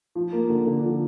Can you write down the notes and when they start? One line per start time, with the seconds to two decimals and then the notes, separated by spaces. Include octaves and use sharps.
0.15 F3
0.33 A#3
0.50 D3
0.67 D3
0.83 F3